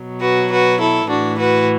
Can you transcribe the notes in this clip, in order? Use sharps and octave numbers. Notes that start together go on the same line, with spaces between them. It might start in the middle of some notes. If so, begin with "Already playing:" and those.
Already playing: B2 F#3
F#4 B4
F#4 B4
E4 A4
A2 E3 D4 F#4
F#4 B4